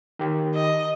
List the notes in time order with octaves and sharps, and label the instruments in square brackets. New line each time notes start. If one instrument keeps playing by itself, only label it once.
[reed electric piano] D#3 G4
[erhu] D#5